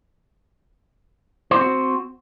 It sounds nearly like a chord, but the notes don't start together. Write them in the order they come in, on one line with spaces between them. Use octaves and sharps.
C5 C4 F#4